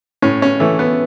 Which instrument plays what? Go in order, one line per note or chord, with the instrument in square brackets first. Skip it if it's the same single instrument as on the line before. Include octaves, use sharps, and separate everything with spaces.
[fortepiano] A2 C#4
C#4
E3 A3
B3